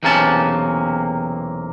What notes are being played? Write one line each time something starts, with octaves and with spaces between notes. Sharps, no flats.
B1 E2 C3 A#3 C#4 A5